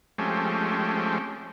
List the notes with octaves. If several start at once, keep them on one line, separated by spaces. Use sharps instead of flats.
F3 G#3 A3 C4 C#4 G4